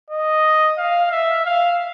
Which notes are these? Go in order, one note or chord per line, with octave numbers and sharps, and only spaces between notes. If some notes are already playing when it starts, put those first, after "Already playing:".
D#5
F5
E5
F5